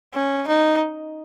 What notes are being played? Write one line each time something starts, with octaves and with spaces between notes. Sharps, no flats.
C#4
D#4